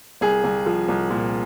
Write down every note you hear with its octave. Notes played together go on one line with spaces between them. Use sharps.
C2 G#4
C2
F3
C2
A#2